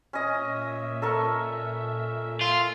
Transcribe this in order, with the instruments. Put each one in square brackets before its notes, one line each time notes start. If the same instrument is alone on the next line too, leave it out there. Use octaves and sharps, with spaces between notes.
[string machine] A#2 E5 [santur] C#4 D#5
[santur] A4 A#4 C#6
[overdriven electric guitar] F4